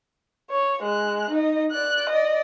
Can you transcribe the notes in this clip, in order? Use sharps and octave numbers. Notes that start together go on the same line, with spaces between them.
C#5
G#3 F#6
D#4 D#5
D5 F#6
D5 D#5